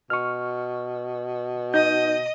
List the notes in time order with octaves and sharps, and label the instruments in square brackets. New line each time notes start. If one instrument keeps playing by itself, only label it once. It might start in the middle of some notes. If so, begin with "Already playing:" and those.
[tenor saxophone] B2 [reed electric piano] C#6 F6
[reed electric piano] D#4 G6 [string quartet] D#5